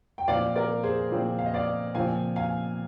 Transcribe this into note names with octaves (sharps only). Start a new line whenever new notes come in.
G5
A#2 F3 C4 D5 F5
A#4 D5
G#4 C5
A#2 F3 C4
F5
D#5
D5 F5
A#2 F3 C4 F5 G#5
F5 G#5